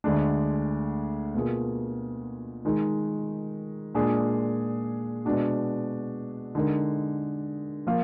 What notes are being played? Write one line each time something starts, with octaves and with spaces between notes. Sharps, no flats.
D2 D3 G#3 D4
B2 A#3 F4 G#4
D#3 G#3 D#4
A#2 G#3 D4 G#4
B2 G#3 D4 F#4
D3 G#3 D#4 A#4
F3 A#3 F4